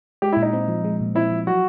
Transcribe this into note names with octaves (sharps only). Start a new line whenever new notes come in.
G#3 G4
E4
A#2
D#4
C4
F3
G#3
A#2
C4 E4
F3
F#3 F#4